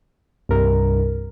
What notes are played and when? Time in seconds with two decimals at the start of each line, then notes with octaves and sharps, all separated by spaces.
0.49 C2 G2 A#4